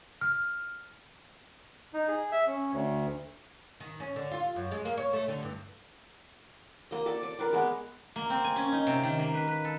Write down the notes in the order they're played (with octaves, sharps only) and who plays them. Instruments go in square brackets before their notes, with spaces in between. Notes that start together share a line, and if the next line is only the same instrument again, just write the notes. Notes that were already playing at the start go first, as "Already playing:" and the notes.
[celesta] F6
[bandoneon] D#4
G#4
E5
C#4
D2
[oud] D#3
C#4
D3
F4
F#2
G#3
A#3
C#5
A3
D3
G2
[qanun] A#3 D#5
A4 D5 A5
D5
A#4 B4 D5
G#3 B3
[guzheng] A#3
C4
G#5
C#4
D#4
C3
D#3
A#3
B4
B4
A4